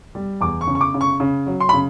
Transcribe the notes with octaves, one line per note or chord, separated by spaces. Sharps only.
G3
E2 D6
C#6
C#3
C#6
D6
C#3
C#6
C#3
F#3
C6
B5
C#3